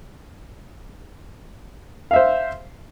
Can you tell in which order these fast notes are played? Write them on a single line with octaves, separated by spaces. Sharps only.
F5 E5 C5